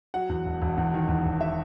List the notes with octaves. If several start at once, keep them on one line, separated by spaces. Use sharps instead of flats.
F#3 F#5
E2
E1
E1
E2
D#3
E2
E1
E5